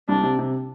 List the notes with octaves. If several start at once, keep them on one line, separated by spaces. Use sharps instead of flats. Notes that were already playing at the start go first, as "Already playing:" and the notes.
C2 D4
C3
C3